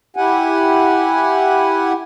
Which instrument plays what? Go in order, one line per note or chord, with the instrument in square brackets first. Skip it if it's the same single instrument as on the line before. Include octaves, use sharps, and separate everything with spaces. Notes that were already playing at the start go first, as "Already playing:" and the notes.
[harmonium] E4 G4 F#5 G#5